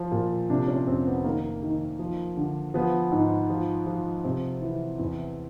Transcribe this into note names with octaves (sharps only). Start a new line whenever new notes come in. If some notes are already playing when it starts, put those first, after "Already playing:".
Already playing: F3
A#2
C3 D4
C#4
F2 C4
B3
D#3 A#3
D#3
F3
D3
F3 B3
G#2
F3
F3
C3 C4
E3
E2